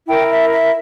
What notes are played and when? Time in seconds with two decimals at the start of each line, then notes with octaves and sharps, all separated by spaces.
0.06 E4 A#4 G5
0.29 E5
0.52 E5